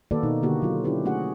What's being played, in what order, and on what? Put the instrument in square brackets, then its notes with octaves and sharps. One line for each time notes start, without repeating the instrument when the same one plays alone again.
[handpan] D#3 A#3 F#4 A4 B4 D5
B2 D#4
D3 A#3 F#4 G4
F#3 F4
C#4 D4 E4 G4 B4
A3 C#4 F#4 G#4 F#5